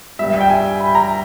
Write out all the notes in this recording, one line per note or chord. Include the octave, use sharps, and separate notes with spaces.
G2 G3 E5
E5
G5
G#5
B5
A#5